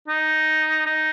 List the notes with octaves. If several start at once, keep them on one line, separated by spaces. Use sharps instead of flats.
D#4
D#4